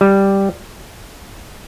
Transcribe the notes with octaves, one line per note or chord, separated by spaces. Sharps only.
G3